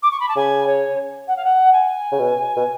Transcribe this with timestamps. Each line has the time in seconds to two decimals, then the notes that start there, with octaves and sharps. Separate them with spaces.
0.03 D6
0.11 C#6
0.20 B5
0.29 A5
0.36 C#3 G#5
0.67 C#5
1.28 F#5
1.37 F5
1.45 F#5
1.73 G#5
2.12 C#3
2.19 B2
2.56 B2